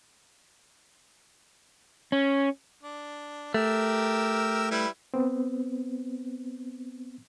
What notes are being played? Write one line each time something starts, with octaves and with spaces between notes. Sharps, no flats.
C#4
D4
A3 G4 A#4 E6
G3 E4 B4
B3 C4